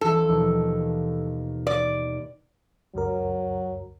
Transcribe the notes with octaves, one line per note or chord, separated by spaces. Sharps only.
D#1 E3 F3 A4
D#2 B2
D5
C#2 F#2 F#3 A#4